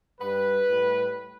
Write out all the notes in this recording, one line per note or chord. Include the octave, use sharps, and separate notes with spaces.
G2 G3 B4
A2 G3